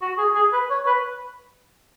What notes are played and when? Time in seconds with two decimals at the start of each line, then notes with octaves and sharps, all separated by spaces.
0.02 F#4
0.18 G#4
0.35 G#4
0.53 B4
0.70 C#5
0.87 B4